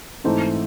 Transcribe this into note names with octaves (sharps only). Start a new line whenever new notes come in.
G#2 E3 A3 C4 D#4